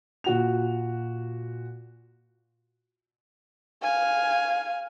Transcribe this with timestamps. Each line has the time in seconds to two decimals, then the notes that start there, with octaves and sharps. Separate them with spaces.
0.24 A#2 F#4 F7
3.83 F5 G#5